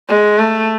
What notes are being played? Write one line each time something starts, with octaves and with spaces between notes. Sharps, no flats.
G#3
A3